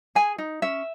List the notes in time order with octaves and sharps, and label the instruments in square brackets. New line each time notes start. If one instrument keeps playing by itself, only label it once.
[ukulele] G#4 G#5
D#4
C#4 E5